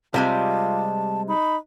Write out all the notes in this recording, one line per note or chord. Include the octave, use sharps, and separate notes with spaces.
C3 G3 G#3 F4 A5
D#4 B5